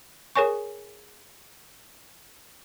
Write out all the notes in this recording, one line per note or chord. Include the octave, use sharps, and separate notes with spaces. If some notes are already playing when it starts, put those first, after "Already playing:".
G#4 A#4 C#5 G#5 C#6